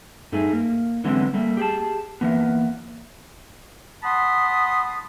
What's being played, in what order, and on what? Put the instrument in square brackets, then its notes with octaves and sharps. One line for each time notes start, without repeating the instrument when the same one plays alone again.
[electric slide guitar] G2 A3 D#4 G#4
A#3
D3 E3 F#3 G#3 B3 C4
G3 A3 A#3
G4 G#4 A5
E3 A#3 B3
[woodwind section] F#5 A5 B5 C6 D#6